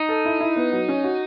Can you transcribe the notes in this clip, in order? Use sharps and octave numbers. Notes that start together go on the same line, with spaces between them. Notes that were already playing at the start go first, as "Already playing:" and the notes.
Already playing: D#4
A4
E4
E4
B3
F#3
C#4
F#4